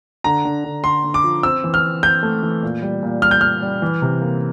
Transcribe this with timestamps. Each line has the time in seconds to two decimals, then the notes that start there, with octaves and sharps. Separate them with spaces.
0.24 D3 A#5
0.45 D3
0.65 D3
0.84 D3 C6
1.04 D3
1.14 D6
1.24 F3
1.43 C4 E6
1.64 E3
1.74 F6
1.83 C4
2.03 C4 G6
2.23 A3
2.43 E3
2.63 A#2
2.82 G3
3.03 A#2
3.22 G3 F6
3.31 G6
3.41 G3 F6
3.62 G3
3.82 E3
4.02 C3
4.21 A#3